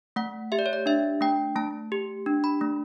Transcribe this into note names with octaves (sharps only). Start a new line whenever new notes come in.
A3 F#5
G4 E5
D5
C#5
D5
D4 E5
A3 G5
A3 A5
G4
D4
B5
A3